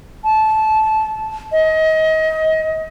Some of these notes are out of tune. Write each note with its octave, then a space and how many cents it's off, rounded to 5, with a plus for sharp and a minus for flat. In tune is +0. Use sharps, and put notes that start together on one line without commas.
A5 -15
D#5 +30